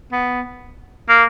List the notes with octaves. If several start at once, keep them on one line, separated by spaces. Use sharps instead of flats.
B3
A#3